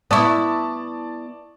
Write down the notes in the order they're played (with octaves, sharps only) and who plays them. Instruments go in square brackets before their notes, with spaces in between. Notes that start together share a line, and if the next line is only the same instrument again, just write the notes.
[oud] B3 E4 [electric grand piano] D5 A5 [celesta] E5 C#6 D#6